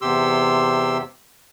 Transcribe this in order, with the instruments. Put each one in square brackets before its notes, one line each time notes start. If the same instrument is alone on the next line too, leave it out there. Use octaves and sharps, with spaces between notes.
[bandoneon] E2 C3 G4 C6 E6